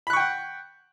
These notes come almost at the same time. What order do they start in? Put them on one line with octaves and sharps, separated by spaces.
B5 F#6 C#6 G5 F#5